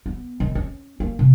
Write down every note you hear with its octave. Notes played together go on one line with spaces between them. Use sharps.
B3
D#3
C#4
A#3
C3